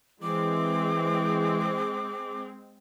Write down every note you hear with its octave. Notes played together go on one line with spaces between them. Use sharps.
E3 G#3 C4 D6